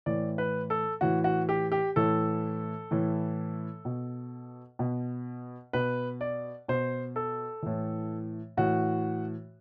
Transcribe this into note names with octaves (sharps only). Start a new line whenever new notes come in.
A2 E3 D5
B4
A4
A2 E3 F#4
F#4
G4
G4
A2 E3 A4
A2 E3
B2
B2
B2 B4
D5
B2 C5
A4
A2 E3
A2 E3 F#4